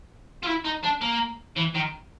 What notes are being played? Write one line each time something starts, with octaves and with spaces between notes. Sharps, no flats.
F4
E4
D#4
D4
A#3
E3
D#3